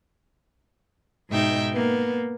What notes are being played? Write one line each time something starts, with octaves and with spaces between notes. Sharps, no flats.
G#2 B2 D#4 E5 G5
A#3 B3